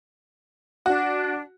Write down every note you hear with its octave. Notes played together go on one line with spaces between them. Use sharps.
D4 F#4